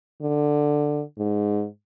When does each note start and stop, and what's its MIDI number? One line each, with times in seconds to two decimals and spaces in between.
0.22 1.03 50
1.18 1.66 44